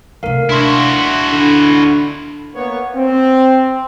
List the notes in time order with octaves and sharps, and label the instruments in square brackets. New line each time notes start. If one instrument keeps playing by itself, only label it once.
[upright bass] D2 C3 [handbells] A#4 F5
[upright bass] D1 [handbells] D4 C6 [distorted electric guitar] E4 F#4
[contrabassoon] D3
[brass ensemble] A#3 B3 C#5
C4